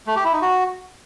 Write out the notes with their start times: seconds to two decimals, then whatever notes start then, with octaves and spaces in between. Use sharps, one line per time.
0.07 A3
0.16 G4
0.24 E4
0.33 D#4
0.42 F#4